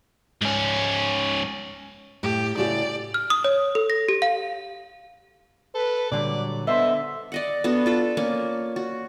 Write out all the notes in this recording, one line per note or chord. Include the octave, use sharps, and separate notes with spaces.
G#2 C#4
A2 G4
A2 C#3 E4 F#4 G4 D5
F6
D#6
C#5
A4
A#6
G4
F5
A4 B4
A#2 D3 F#3 G3 D5
D3 B3 C5 D#5 E5
D5 D#5 F#5
B3 D4 F#4 A4
F4 A4 B5
A#3 C#4 D5
F#4